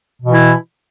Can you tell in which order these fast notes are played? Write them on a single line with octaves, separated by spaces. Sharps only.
B2 E3 E4